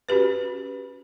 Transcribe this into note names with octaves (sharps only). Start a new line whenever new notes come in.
C#4 F#4 G4 B4